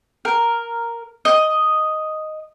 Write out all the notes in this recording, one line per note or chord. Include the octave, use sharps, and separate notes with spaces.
A#4
D#5